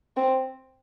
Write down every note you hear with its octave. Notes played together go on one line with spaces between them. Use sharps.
C4